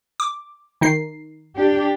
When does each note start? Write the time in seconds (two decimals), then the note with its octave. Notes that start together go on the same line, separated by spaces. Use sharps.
0.20 D6
0.81 D#3 D#4 C7
1.56 D4 G4